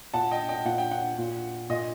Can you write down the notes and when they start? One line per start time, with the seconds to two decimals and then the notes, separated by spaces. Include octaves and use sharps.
0.14 A#2 F#5 A5
0.31 D#5 G5
0.49 D#5 G5
0.65 A#2 F#5
0.78 G5
0.91 F#5
1.18 A#2
1.70 A#2 D#5